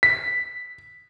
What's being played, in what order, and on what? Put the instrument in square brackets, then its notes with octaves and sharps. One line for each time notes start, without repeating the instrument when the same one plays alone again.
[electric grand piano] B6